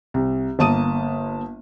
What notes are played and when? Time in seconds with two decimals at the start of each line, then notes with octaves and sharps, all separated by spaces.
0.14 C2
0.59 G1 A#3 A5 D#6 D#7